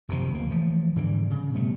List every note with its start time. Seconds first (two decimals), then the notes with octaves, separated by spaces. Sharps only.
0.09 F#1 C3 D#3 F3
0.34 D2 F3 A#3
0.50 E3 F3 A3
0.96 G#2 D3 E3 G3
1.30 C#3
1.54 B2 G3 A3